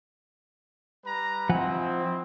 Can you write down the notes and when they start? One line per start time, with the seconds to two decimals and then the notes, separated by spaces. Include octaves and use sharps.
1.04 G3 B4 A#5
1.49 F3 C4 D#4 E4 F#5 G#5